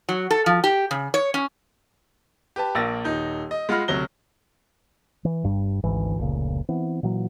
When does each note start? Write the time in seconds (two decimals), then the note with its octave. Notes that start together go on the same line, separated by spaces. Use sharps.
0.09 F#3
0.31 A4
0.46 F3
0.64 G4
0.91 C#3
1.14 C#5
1.34 C#4
2.56 G4 B4 A5
2.75 A#1 A#3 E6 A6 A#6
3.04 D#1 D#4 G6
3.51 D#5
3.69 G#3 F4 F#5 B5 F6 A#6
3.88 D2 C3 F#3 A#6 G7
5.25 E3
5.43 G1 G2 G3
5.84 G#1 D2 G#2 E3
6.18 F1 C#2 A#2 C#3
6.69 E3 B3 C4
7.03 A#2 E3 F#3